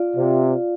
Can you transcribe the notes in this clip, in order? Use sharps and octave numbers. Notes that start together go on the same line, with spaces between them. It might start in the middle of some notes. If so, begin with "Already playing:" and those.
Already playing: F4 D5 F5
C3